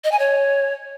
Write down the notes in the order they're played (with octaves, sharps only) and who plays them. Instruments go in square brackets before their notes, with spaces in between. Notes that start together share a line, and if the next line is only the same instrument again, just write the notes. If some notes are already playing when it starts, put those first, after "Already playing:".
[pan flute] D#5
G#5
C#5